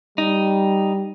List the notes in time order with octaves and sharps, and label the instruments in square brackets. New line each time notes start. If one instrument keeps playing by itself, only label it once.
[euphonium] G3 [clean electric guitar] D#4